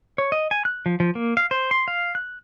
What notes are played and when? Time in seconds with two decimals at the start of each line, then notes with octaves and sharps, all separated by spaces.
0.18 C#5
0.32 D#5
0.51 G#5
0.65 F#6
0.86 F3
1.00 F3
1.15 A#3
1.37 F5
1.51 C5
1.71 C6
1.88 F5
2.15 F#6